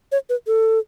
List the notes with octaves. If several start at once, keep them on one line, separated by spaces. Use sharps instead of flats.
C#5
B4
A4